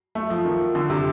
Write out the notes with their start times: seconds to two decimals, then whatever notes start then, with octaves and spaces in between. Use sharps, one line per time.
0.15 A3
0.30 F3
0.45 D#3
0.75 D3
0.90 C3